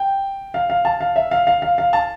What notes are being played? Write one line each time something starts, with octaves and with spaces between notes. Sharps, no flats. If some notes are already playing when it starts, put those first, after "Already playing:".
Already playing: G5
F5
F5
A5
F5
E5
F5
F5
F5
F5
A5